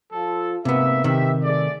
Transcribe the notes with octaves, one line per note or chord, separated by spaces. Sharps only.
F3 F4 A4
G#2 C3 A#3 B3 E5
C3 D#3 G4 B4 E5
A3 G#4 D5